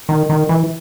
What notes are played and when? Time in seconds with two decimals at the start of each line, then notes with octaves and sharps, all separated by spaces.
0.09 D#3
0.30 D#3
0.49 E3